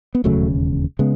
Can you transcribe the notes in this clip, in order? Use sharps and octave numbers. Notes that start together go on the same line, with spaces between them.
B3
E1 D#2 C#3 F#3 A3
C#3 G#3 B3